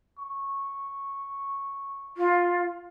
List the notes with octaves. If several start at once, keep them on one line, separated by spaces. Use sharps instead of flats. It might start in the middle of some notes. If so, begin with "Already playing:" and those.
C#6
F4